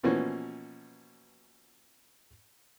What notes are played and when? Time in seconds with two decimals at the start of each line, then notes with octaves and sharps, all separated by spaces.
0.03 B2 E3 F3 A#3 C#4